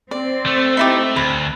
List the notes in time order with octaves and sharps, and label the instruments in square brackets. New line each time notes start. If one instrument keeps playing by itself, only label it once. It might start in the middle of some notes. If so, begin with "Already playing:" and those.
[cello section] C4 [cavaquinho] D5
[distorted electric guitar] A3
[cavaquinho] D#4 E4 G4
[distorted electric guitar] D2 [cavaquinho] B4